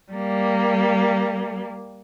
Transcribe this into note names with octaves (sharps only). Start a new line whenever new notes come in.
G3 A#3